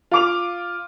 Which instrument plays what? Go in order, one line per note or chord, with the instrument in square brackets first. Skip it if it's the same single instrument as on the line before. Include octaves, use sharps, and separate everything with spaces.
[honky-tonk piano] F4 D6 F7